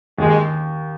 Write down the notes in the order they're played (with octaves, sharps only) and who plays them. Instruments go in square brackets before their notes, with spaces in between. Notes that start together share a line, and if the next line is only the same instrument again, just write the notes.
[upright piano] D#2 [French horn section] G#3